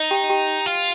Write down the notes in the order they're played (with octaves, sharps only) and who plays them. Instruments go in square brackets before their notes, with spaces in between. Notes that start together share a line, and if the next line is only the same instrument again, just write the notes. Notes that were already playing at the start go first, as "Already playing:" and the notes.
Already playing: [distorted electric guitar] D#4 [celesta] D#5
[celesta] G4 G5
G4 G5
[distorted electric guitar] F4